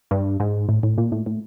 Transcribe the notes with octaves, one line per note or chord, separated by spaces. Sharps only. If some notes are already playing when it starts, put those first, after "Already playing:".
G2
G#2
A2
A2
A#2
A2
A2